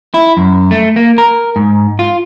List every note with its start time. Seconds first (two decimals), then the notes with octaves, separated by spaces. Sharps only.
0.14 E4
0.37 F#2
0.71 A3
0.96 A#3
1.18 A#4
1.56 G#2
1.99 F4